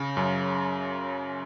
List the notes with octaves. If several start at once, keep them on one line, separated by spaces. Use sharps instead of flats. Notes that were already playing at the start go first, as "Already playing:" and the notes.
Already playing: C#3
F#2